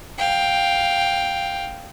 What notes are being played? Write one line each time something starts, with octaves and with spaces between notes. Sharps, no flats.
F5 G5